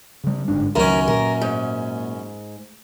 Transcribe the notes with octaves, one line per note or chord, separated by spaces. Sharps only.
C#3 G3
G1 G#2 D4
C#2 F#2 D#3 C#4 A#4
A#2 A#4
G#2